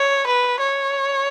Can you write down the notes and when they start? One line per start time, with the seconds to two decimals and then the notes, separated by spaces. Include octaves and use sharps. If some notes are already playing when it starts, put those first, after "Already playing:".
Already playing: C#5
0.26 B4
0.60 C#5